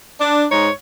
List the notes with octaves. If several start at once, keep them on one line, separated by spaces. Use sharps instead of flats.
D4
G#2 D#4 C#5